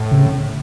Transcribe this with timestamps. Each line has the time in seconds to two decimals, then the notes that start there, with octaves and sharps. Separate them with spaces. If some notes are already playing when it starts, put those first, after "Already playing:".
Already playing: A2
0.11 C#3